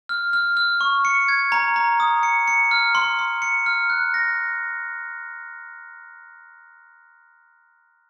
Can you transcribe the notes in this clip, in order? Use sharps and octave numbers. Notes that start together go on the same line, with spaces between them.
F6
F6
F6
C#6
C#7
G#6
A#5
A#5
D#6
C#7
C#7
F6
C6
C6
C#7
F6
F#6
A#6